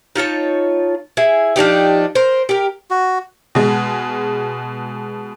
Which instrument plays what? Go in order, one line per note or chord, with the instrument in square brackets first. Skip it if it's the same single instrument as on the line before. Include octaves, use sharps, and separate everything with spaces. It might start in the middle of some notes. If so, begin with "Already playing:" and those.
[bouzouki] D#4 F4 C#5 A5
E4 G#4
F3 D4 D#4 G4
A#4 C5
G4 A#4
[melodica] F#4
[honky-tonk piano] B2 G#3